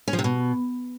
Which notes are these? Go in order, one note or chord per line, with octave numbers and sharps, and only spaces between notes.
C#4
F3
C3
B2